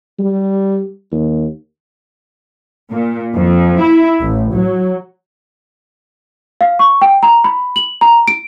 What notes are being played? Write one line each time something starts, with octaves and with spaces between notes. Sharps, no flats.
G3
D#2
A#2
F2
E4
A1
F#3
F5
C#6
G5
A#5
B5
F#7
A#5
D7